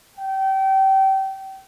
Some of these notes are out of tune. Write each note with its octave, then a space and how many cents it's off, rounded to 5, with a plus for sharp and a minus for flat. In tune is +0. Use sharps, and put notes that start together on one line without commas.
G5 -30